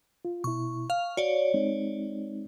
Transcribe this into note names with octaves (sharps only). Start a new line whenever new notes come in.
F4
B2 E4 C#6
F5 F6
F#4 C#5 D5
G#3 C4 D#4